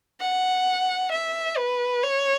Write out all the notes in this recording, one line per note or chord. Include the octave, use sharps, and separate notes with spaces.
F#5
E5
B4
C#5